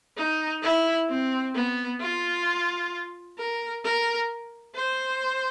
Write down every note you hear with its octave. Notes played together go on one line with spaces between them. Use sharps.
D#4
E4
C4
B3
F4
A#4
A#4
C5